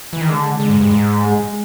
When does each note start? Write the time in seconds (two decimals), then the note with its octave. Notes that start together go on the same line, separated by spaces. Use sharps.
0.13 E3
0.21 D#3
0.29 D3 G#3
0.60 D3
0.70 G#2
0.81 G2
0.91 G#2
1.23 G#3